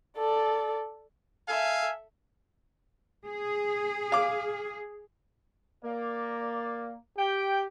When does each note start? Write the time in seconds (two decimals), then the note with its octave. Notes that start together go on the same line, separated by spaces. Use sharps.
0.17 A4 D5
1.48 A4 E5 F5 G#5
3.26 G#4
4.12 F5 D6
5.85 A#3 D5
7.18 G4 G5